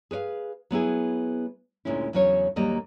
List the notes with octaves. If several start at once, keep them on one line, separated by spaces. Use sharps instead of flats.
G#4 B4 C#5 F5
F#3 B3 E4 G#4
D2 A#2 G#3 C#4 E4
E2 C#3 F#3 C#4 A#4 C#5
D#2 F#3 G3 A#3 D#5